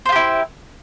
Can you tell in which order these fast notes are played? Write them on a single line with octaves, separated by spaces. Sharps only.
C5 F4 G4 E4